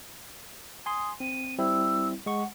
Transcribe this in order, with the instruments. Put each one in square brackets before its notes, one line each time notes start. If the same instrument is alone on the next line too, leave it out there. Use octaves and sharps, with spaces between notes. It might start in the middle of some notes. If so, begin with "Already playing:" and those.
[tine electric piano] G#5 C6 [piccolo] D#6
[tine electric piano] C4 [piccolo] D#7
[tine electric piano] G3 C4 E4 [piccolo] E6
[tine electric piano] G#3 C#6 [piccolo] F#5